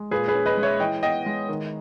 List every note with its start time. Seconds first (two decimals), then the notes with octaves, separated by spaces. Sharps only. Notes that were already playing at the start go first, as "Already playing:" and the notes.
Already playing: G#3
0.11 A#2 G#4 B4
0.28 G#4 B4
0.34 C#4
0.46 B4 D#5
0.57 G#3
0.63 C#5 E5
0.80 E3 D#5 G5
1.03 B3 D#5 G5
1.26 G#3
1.49 D#3